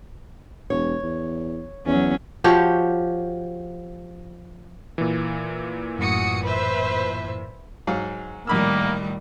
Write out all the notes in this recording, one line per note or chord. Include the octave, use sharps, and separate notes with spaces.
E1 C#5
E2
E2 F#3 C#4
F3 F#4 G4 C#5
A#2 E3
F#2 A2 F#4 D#6 C#7
B4 C5 E5
G#2 F#3 F5
A#1 A2 D#3 G3 A#3 B5 E6